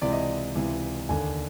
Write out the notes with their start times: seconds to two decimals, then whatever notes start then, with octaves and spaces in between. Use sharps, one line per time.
0.02 C#2 C3 E3 D5
0.13 D#5
0.22 D5
0.55 C#2 C3 E3
1.09 D#2 D3 G#5